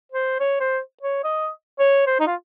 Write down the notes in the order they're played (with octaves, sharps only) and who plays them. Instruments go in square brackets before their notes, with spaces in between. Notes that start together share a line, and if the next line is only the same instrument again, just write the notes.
[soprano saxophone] C5
C#5
C5
C#5
D#5
C#5
C5
D#4
F4